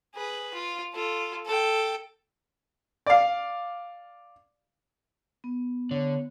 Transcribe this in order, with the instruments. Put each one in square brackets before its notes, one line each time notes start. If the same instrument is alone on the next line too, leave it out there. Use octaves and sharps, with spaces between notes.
[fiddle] G#4 B4
F4
F4 A4
A4 G5
[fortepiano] D5 F5
[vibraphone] B3
[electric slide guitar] D3 [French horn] C#5